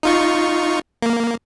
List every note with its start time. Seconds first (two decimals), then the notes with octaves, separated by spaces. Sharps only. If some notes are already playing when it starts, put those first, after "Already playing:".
0.03 D#4 F4 C#6
1.02 A#3